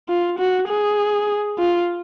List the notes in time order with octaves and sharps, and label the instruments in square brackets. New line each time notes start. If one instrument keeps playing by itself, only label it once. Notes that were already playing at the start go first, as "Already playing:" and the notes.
[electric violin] F4
F#4
G#4
F4